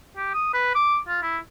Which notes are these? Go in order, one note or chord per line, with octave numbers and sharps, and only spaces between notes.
G4
D#6
B4
D6
F4
E4